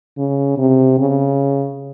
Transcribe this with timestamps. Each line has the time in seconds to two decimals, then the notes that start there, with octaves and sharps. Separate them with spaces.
0.18 C#3
0.58 C3
0.98 C#3